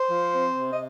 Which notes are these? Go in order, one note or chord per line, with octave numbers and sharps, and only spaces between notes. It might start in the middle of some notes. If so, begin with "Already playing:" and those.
Already playing: C5
F3
C4
C3
D#5